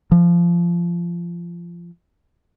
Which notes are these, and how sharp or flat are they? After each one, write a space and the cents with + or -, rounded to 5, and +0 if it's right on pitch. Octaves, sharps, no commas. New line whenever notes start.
F3 -20